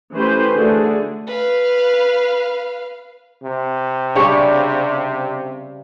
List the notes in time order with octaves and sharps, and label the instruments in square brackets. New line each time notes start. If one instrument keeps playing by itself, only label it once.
[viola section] E3 A3 C#4 G4 B4 C5
D3 A3 D4 F#4 G#4
[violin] B4 F5
[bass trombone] C3
[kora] C#3 G3 F5 [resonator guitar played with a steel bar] D4 G4 C#5